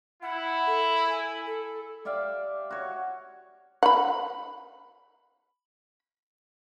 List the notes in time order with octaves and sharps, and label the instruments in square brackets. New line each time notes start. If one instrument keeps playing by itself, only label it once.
[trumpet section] E4 [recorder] F#5
[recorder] A4
G#5
A4
[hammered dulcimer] G4 D5 E5 F5
F#4 C#5
[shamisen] F#5 B5